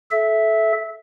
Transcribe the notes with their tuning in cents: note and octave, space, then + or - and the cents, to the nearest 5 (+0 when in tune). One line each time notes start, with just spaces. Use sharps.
A4 -25 E5 +0